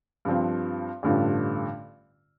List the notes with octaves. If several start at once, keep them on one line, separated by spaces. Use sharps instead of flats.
G2 F3 C4
A1 G2 D3 A3 F4